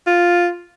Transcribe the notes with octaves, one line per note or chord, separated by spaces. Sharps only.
F4